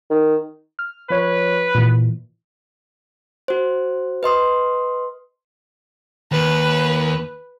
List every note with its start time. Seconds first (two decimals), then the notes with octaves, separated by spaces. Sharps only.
0.10 D#3
0.79 F6
1.10 F3 B4 C#5
1.75 A#2 E3
3.48 F#4 C5
4.23 B4 D#5 C6 D#6
6.32 D#2 B4